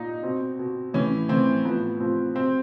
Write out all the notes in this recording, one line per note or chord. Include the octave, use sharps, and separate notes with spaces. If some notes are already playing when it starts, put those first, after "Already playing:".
Already playing: A#2 D#4
B2 C4
B2
A2 E3 C#4
A2 E3 C4
A2 F3 B3
A2 F3 C4
B2 C4